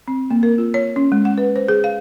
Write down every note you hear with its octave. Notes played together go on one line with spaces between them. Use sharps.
C4
A#3
A#4
F4
C#5
C#4
G#3
F#5
B4
C5
G#4
F5